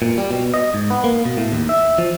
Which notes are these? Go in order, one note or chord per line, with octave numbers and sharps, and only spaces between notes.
A#2
G3
B2
D#5
G#2
B3
A#3
B2
A2
D#2
E5
F3